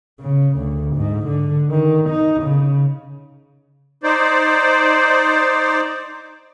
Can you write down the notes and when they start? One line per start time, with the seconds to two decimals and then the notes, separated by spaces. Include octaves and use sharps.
0.21 C#3
0.57 D2
0.96 G#2
1.27 D3
1.70 D#3
2.10 D#4
2.43 C#3
4.03 D#4 C5 D5